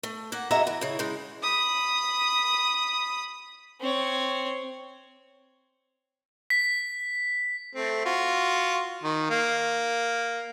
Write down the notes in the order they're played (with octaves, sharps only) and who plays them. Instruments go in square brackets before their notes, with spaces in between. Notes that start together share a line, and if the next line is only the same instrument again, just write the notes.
[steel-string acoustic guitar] A3
A#3 F#5
F#2 G#3 D#5 E5 F#5 A#5
E3
C#3 E4
C#3 G#3
[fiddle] B5 D#6
[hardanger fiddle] C4 C#5
[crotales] B6
[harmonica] A3 C4
F4 F#4
D#3
A#3